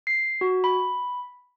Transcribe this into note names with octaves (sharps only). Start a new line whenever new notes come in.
C7
F#4
B5